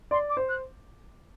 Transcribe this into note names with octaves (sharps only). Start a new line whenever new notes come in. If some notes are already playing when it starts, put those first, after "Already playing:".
D5 C6
D6
C5
F#6